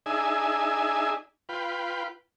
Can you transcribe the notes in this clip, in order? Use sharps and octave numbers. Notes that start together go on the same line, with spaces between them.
D4 D#4 G#4 E5 G#5
F4 B4 G5